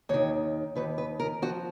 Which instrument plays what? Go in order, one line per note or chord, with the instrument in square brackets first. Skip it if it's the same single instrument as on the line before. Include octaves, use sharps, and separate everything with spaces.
[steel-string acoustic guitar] D#2 D#3 C#5
D#2 D#3 B4
B4
A#4
F3 F#4